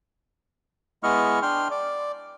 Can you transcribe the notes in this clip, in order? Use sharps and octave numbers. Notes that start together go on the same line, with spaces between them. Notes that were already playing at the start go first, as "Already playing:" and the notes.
G#3 B3 E4 D#5 C#6 F6
D4 G5 C6 F6
D5